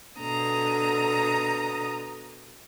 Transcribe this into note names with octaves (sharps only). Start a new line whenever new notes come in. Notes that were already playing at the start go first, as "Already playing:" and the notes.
B2 D3 A#5 D#6